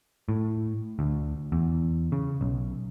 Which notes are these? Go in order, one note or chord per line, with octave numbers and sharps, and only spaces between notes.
A2
D2
E2
C#3
B1